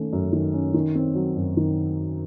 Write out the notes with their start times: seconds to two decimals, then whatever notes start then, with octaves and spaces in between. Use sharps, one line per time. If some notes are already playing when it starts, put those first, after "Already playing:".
Already playing: D#3 A3 C#4
0.13 F#2
0.33 D#3
0.54 C#4
0.74 D#3
0.95 C4
1.15 F#3
1.36 F#2
1.57 D#3